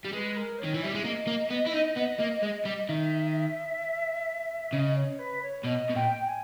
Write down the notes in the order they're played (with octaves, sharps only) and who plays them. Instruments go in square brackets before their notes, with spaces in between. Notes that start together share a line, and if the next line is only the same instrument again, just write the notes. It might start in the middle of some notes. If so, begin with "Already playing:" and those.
[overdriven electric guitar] G3
[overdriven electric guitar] G#3 [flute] B4
[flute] A#4
C#5
[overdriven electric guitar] D#3
E3
[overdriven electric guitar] G3 [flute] E5
[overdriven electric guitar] G#3
[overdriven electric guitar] A#3 [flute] D#5
[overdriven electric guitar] A#3
B3
E4
D#4
B3
A#3
G#3
G3
[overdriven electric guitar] D#3 [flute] E5
[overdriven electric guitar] C#3 [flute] D#5
[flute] C#5
B4
C#5
[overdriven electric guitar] B2 [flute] D#5
[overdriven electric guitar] B2
[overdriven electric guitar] A#2 [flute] G5
[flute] G#5